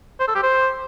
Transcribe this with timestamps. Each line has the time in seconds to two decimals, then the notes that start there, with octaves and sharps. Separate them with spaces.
0.20 C5
0.28 A4
0.35 G4
0.43 C5